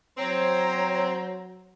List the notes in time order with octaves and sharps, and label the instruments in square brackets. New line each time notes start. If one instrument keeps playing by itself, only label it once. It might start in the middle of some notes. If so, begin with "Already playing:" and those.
[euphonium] F#3 [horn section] C4 [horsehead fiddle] C5 A#5 [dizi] C#5